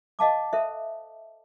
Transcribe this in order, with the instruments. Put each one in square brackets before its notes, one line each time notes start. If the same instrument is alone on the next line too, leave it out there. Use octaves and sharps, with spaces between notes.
[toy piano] D#5 F5 A5 D6
A4 C5 E5